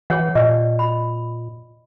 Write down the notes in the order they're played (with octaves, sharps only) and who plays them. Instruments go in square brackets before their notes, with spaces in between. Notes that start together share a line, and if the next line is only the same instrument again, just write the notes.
[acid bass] E3 [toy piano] G#4 C#5 F#5
[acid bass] A#2 [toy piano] D5 D#5
[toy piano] B5